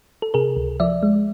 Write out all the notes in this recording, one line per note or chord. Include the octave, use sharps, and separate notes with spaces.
A4
C3 G#4 A#4
C#2
F3 D5 E5
G#3